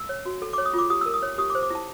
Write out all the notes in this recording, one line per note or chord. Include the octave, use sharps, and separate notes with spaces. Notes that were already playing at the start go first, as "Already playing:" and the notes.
Already playing: E6
C#5
F#4
A4
D6
C#5
D#6
F4 D6
G4 D#6
A#4 E6
D#6
C#5
G4 D#6
D6
C5
D6
E4 A5